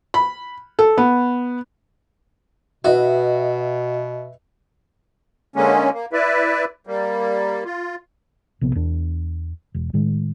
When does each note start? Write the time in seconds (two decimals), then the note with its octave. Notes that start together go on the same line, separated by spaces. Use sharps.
0.14 B5
0.79 A4
0.97 B3
2.85 B2 F#4 B4 D#5 E5
5.56 D3 G#3 A#3 C#4
5.93 A#3
6.13 E4 B4 D5 E5
6.87 G3 A#3
7.65 F4
8.61 A#1 C3 B3
8.75 E2 D4
9.74 E1
9.93 A2 D#3 G#3